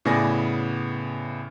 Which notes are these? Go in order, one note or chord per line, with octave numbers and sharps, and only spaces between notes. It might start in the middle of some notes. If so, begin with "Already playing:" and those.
A2 C#3 B3 D5 G#5 A#6